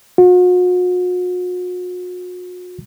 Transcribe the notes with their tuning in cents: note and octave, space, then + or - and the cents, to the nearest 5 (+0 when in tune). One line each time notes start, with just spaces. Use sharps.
F#4 -45